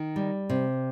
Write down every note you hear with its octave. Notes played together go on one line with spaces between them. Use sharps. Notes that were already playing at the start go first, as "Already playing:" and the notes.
Already playing: D#3
G3
C3